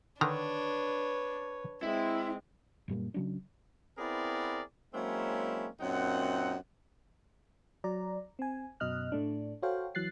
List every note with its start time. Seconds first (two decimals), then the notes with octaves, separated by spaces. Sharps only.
0.21 D3 D#3 D4 B4 C#5 A#5
1.83 G#3 C4 E4
2.88 F#2 A#2 G3 A#3
3.14 C#3 F#3 D4
3.98 B3 C4 E4 G#4 A#4 D5
4.94 F#3 G#3 A#3 C4 C#4 E4
5.80 F#2 A#2 C4 D#4 F#5
7.84 F#3 D5 A#5
8.39 C4 G#5
8.80 F#2 B2 D#5 F6 F#6
9.12 A2 A3 D4
9.62 F#4 A4 C5 C#5 F5 G5
9.95 E3 F#3 F#6 A6 C7